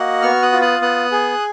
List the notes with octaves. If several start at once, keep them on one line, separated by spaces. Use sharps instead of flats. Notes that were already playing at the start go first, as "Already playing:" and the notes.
Already playing: A#3 F#4 D#5 F#5
B3 C#6 F6
D#6 F#6
F4
D#6 F#6
B3 D#6 F#6
G#4